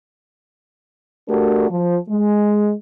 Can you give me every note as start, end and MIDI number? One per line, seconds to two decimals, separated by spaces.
1.29 1.68 57
1.29 1.68 62
1.29 1.68 66
1.29 1.68 67
1.29 1.68 70
1.70 1.97 53
2.09 2.74 56